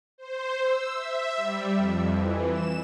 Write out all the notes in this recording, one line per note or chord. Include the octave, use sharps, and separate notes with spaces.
C5
E6
E5
G3
F2
E3
E7